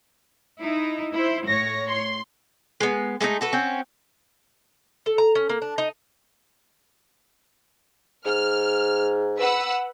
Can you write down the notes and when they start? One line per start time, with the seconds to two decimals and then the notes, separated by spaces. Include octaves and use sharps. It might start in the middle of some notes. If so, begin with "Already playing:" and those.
0.61 D#4 E4
1.15 E4 C5
1.47 A2 C#5 A#6
1.89 C6
2.80 G#3 B3
3.21 G#3 A3 B3 D#4
3.41 F#4 A4 B4
3.52 C4 C#4 F#4
5.06 A4
5.18 A#5
5.35 C#4
5.49 A#3
5.62 D4
5.78 D#4
8.26 G#2 F6
9.39 B4 F#5 E6